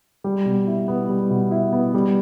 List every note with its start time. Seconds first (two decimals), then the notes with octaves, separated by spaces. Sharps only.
0.24 G3
0.45 B2
0.67 E4
0.88 B3
1.09 G3
1.30 B2
1.51 E4
1.73 B3
1.94 G3